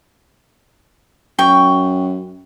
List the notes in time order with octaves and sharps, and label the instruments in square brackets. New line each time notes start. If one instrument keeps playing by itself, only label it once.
[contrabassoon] F#2 [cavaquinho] G5 C#6